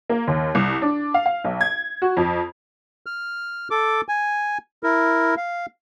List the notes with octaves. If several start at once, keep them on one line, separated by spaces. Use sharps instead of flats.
A#3
D#2
C2
D4
F5
F5
B1
G#6
F#4
F2
F6
A4 D6
G#5
E4 A#4
F5